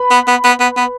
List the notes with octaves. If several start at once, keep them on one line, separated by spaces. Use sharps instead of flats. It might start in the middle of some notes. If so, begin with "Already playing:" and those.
Already playing: B4 B5
B3
B3
B3
B3
B3